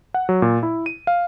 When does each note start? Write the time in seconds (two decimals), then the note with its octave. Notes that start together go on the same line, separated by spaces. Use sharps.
0.14 F#5
0.29 F#3
0.42 A#2
0.63 E4
0.86 D#7
1.07 F5